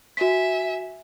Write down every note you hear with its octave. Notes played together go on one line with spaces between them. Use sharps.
F#4 E5 G#5 B6